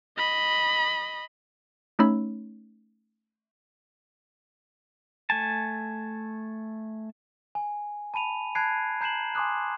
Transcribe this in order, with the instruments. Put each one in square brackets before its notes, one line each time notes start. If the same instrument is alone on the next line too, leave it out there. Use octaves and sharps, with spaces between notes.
[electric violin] D#5 B5
[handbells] A3 C#4 D#4 C#5 B5 E6
[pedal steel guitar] A3 G#5 A5
[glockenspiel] G#5
A5 B5 D#7 F7
A5 B5 F#6 G#6 C7 D7
A#5 G6 C7 E7 F#7
G#5 C6 D6 D#6 F#6